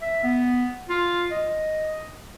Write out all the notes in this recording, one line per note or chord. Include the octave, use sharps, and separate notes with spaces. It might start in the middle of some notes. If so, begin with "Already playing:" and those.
E5
B3
F4
D#5